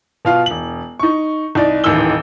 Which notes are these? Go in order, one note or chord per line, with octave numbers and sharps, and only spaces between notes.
B2 F4 F5
E1 F#7
D#4 C#6
C2 D#4 D5
D#1 A1 D#3 E3 E6 G7